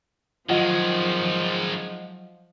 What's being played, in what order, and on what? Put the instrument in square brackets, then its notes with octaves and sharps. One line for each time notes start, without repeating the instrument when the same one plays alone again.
[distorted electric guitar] D#3 G#3 [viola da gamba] F3 [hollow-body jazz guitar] F#3 F4 [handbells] D#5 F#5